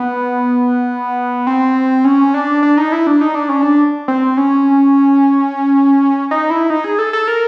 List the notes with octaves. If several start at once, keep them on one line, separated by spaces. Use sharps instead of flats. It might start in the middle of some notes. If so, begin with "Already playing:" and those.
Already playing: B3
C4
C#4
D4
D4
D#4
E4
D4
D#4
D4
C#4
D4
C4
C#4
D#4
E4
D#4
G#4
A4
A4
A#4